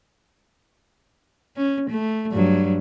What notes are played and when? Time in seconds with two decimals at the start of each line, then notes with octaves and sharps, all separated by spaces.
1.57 C#4
1.90 A3
2.32 G2 F#3